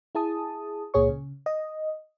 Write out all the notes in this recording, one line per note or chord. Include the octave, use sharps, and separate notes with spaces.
E4 G#4 A5 D#6
C#2 A#2 G#4 C#5 C#6
C#3
D#5